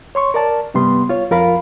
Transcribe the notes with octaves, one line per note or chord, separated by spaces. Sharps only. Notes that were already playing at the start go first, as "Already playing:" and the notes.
C#5 C6 C#6
A#4 D5 A5
G2 C3 G3 B3 C6
F4 C#5
F2 F4 A#4 F5 B5